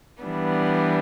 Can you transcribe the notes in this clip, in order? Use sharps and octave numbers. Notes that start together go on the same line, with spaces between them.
E3 G3 B3 D4